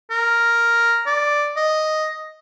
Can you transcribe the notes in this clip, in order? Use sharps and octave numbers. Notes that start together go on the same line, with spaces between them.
A#4
D5
D#5